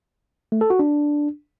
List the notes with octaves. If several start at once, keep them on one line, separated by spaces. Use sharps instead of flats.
A3
A4
F#4
D4